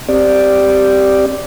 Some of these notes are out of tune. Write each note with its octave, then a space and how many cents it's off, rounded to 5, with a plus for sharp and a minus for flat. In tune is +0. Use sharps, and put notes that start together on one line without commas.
C4 +0 G4 +0 D5 +0